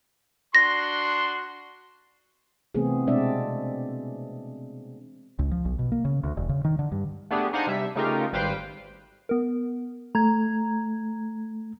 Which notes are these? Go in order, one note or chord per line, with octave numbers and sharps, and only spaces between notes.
D4 F#4 C6 A#6
C3 E3 A3 B3 C4 G#4
B2 G#3 C4 D4 D5 E5
C#2
F3
B1
B2
A#3
C#3
D2
E1
C#3
D#3
D3
G2
A3 B3 D4 G4 G#4
D4 D#4 C5 F5 F#5 G#5
C3 G3 E5
C#3 A3 D#4 F4 G4 A#4
G#1 G3 B4 C5 F5 G5
B3 A#4
A3 A#5 G#6